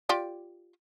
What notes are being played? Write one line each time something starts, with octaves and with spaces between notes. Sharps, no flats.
F4 G4 D5